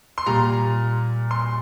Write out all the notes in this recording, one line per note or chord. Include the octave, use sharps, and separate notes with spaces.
C6
A#2 G3 A#5
C6